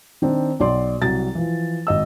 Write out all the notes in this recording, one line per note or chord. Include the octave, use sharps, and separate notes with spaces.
D#3 C4 D4
B1 D5 C6
C2 F#3 A6
E3 F3
G#1 D#5 E6